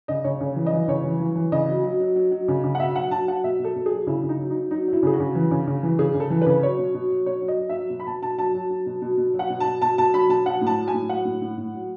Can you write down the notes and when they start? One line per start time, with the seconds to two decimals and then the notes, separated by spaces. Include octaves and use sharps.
0.08 C#3 D#5
0.24 C#3 C#5
0.40 C#3 C#5
0.56 E3
0.66 D#5
0.73 E3
0.88 C#3 C#5
1.04 E3
1.20 E3
1.35 E3
1.52 C#3 D#5
1.69 F#3
1.83 F#3
2.00 F#3
2.16 F#3
2.31 F#3
2.48 C#3
2.64 C#3
2.75 F#5
2.80 B2 E5
2.95 F#3 F#5
3.11 F#3 A5
3.28 F#3 F#5
3.44 B2 E5
3.59 B2
3.64 A4
3.76 B2
3.86 G#4
3.91 F#3
4.07 C#3 E4
4.23 C#3
4.29 D#4
4.39 F#3
4.50 F#3 D#4
4.71 F#3 D#4
4.88 F#3
4.93 E4
5.03 C#3 G#4
5.13 F#4
5.20 C#3
5.35 E3
5.51 C#3
5.67 C#3
5.83 E3
5.99 C#3 G#4
6.14 C#3
6.20 A4
6.30 E3
6.41 C#3 B4
6.62 F#3 C#5
6.79 B2
6.94 B2
7.10 F#3
7.26 B2 C#5
7.42 F#3
7.48 D#5
7.59 F#3
7.70 F#3 E5
7.90 B2
8.00 B5
8.07 B2 A5
8.22 B2 A5
8.38 F#3 A5
8.54 F#3
8.70 F#3
8.86 B2
9.02 B2
9.18 B2
9.34 F#3
9.39 F#5
9.50 B2
9.60 A5
9.65 B2
9.82 B2 A5
9.98 B2 A5
10.14 F#3 B5
10.29 B2 A5
10.45 F#3 F#5
10.61 A2
10.67 A5
10.78 F#3
10.88 G#5
10.94 A2
11.09 F#3 F#5
11.25 A2
11.42 A2
11.57 A2
11.73 F#3